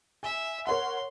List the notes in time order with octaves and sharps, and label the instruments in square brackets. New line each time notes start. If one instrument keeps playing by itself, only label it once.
[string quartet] E5 [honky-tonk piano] G#5
[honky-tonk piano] A#4 C#5 F#5 [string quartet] C6